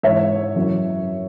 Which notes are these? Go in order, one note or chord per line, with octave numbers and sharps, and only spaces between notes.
G#2 E3 C#5 E5
F#2 E3